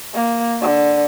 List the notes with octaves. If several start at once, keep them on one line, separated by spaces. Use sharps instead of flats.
A#3
D3